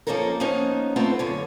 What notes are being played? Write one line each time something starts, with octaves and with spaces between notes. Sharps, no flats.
F3 A#3 C#4 D#4 A4 A#4
F3 A#3 B3 C#4 D#4
A3 B3 C4 F4 C5
F#2 D3 C#5